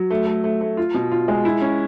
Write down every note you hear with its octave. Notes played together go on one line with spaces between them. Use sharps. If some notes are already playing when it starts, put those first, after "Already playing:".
Already playing: F#3
A3
A3
A3
A3
F4
B2
F4
G#3
E4
C#4